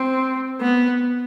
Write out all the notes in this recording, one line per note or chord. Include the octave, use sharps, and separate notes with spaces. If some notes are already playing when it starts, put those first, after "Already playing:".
Already playing: C4
B3